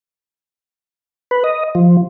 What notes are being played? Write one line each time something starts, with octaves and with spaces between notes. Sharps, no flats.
B4
D#5
F3